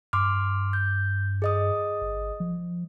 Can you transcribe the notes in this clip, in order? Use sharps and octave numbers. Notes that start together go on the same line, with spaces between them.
G2 C6 D6 F6
G6
G#4 D#5 D#6
G#1
F3